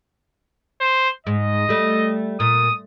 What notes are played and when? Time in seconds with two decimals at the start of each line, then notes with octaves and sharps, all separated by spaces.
0.81 C5
1.27 G#2 D#5
1.69 G3 A3
2.40 A#2 D#6